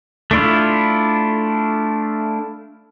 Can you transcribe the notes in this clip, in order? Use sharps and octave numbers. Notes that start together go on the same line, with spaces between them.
A3 D4 E4 F4